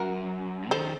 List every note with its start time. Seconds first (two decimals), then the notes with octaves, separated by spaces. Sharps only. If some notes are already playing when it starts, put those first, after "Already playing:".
Already playing: F#2 F#4 A#4
0.71 D#3 A4 C5